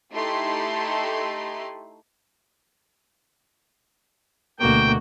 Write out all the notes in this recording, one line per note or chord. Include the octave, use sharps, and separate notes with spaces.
A3 D#4 E4 G4 A4 C6
D2 B2 A#3 F#4 G5